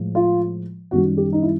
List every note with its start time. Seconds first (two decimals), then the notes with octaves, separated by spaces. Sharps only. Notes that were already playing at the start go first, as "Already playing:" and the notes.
Already playing: A2 F3 G#3
0.15 F4
0.91 F#2 D#3 G3 F#4
1.17 G4
1.33 D#4
1.42 E4